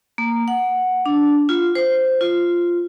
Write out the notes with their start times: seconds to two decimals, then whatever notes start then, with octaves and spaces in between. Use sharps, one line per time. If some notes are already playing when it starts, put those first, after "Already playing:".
0.18 A#3
0.48 F#5
1.06 D4
1.49 F4
1.75 C5
2.21 F4